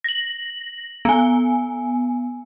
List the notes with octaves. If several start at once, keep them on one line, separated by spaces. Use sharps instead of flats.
A#6 F#7
B3 G#5